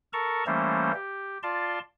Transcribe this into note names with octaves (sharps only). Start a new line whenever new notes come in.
A4 A#4 A5 A#5 C#6
E3 G3 A3 A#3 C#4 C5
G4
F4 D5 A5 C6